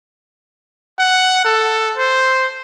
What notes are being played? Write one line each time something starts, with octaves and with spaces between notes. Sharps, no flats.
F#5
A4
C5